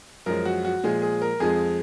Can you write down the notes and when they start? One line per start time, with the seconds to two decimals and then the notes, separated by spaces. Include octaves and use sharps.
0.26 F#2 F3 G#3 A#4
0.45 F#4
0.65 F#4
0.83 A#2 F3 G#3 G#4
1.02 G#4
1.22 A#4
1.40 F2 F3 G#3 G#4